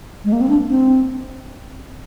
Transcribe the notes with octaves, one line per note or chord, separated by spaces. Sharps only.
G#3
A#3
C4
D4
C4